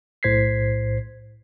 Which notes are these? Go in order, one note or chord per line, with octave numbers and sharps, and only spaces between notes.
B1 A2 C5 G#6 B6 C7